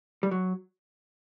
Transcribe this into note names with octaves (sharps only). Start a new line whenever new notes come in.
G3
F#3